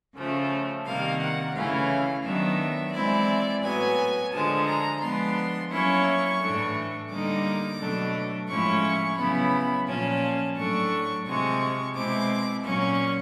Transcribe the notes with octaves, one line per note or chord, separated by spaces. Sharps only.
C#3 F3 A3
C3 D#3 G3 A#3 F5
F#5
C#3 E3 A3 C#4 E4 F5
D#3 F#3 B3 D4 E5
E3 G#3 C4 E4 D5
A2 F#3 B3 G#5
D3 F3 G#3 A5
A#5
F3 G#3 B3 D4 C6
F#3 A#3 C#4 E4 C#6
A2 E3 A3 D4
D3 G3 A#3 D#4 D6
B2 F#3 A3 D4
A2 F3 G#3 C#4 E4 C#6
C#3 F#3 B3 E4 B5
A#2 F3 A#3 C#4 A5
A2 F#3 A3 D4 C#6
C3 F3 G#3 C#6
B2 G#3 C4 E4 D6
A#2 F#3 A#3 C#4 C#6